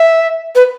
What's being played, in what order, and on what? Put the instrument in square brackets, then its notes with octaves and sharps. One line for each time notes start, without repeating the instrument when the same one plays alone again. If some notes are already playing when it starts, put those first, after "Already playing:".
Already playing: [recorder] E5
B4